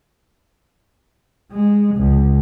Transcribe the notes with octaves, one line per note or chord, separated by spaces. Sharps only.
G#3
C#2